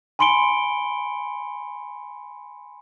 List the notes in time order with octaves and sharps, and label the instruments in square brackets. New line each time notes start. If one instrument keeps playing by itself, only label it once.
[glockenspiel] G#5 B5 C6 C#7 D7 G7